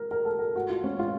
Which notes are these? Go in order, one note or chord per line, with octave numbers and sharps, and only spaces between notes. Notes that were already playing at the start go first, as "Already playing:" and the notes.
Already playing: A#4
A#4
A4
A#4
F#4
F4
C#4
F4